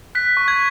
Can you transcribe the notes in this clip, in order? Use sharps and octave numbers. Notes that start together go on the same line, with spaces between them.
F#6 B6
C#6
G#6